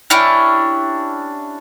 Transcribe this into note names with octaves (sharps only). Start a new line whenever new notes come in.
C#4 D4 E4 G4